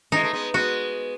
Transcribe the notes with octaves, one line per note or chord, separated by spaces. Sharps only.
E3 G#3 D#4
A3
G#3 B3
G#3 B3 F#4